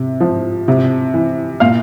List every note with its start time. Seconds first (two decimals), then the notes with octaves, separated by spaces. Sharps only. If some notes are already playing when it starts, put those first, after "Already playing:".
Already playing: C3
0.20 F3
0.68 C3
1.14 E3
1.60 A#2 F5